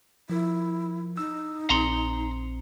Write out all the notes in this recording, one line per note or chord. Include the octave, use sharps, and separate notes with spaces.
F3 E4 A#4
D#4 E6
A#1 C4 A#5 C6 C#7